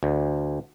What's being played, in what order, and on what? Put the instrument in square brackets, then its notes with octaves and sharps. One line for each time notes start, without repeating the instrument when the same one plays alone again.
[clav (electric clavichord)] D2